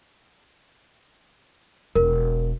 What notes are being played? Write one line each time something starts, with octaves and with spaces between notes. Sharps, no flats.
E1 A#4